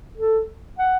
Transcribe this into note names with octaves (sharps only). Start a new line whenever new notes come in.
A4
F#5